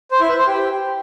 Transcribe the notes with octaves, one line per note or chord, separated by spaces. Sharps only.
C5
E4
B4
C5
G4